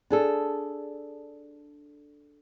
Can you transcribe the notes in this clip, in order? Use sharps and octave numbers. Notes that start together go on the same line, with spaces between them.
D4 G#4 A4